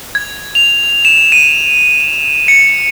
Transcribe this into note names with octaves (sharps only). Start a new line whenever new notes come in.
G#6
F7
E7
D#7
C#7